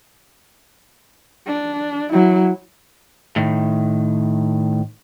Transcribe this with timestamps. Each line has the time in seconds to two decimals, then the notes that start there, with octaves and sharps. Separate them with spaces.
1.47 D4
2.12 F#3 E4
3.36 A2 D#3